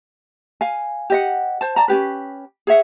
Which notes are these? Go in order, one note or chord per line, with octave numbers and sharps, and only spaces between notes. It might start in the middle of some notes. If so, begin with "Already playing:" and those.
F5 G#5
G4 D#5 F#5
C5 A5
D5 A5 A#5
C#4 D4 G4 B4
G#4 C#5 E5 F#5